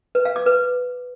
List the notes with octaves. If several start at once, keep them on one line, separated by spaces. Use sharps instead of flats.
B4
F5
D6
B4